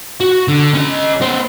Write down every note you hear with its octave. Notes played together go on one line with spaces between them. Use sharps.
F#4
D3
C#4 D#5
B3 C5